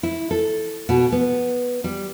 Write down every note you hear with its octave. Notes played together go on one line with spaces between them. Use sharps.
E4
A4
B2
B3
G3